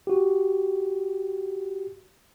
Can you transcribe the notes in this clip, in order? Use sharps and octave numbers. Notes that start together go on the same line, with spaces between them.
F#4 G4